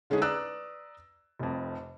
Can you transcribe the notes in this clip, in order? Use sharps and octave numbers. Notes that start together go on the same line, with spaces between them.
D3 G#3 C#4 D#4 E4 G#4
B4 D5 A#5 D#6 E6 F#6
F1 F2